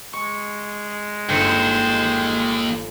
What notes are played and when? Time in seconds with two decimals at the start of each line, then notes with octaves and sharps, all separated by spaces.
0.13 G#3 C#6
1.30 G1 D#2 C5 C#7